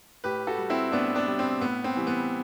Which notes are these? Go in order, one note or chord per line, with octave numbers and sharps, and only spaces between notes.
A2 G4 B4
F#4 A4
G3
C4 E4
A2 B3 D4
B3 D4
G3
C4
A2 B3
C4
E3 G3
B3